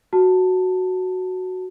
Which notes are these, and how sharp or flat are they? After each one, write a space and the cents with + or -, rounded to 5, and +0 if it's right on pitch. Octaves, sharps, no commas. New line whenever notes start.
F#4 +0 A5 +10